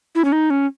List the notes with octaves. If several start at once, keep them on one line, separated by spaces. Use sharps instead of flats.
E4
C#4
D#4
C#4